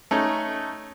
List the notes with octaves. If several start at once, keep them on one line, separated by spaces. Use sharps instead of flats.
A3 C#4 D#4